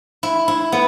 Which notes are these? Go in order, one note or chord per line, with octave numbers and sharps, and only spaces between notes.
E4
E4
B3